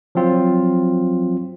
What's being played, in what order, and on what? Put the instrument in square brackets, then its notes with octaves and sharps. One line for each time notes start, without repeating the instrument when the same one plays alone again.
[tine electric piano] F3 F#3 C4 F4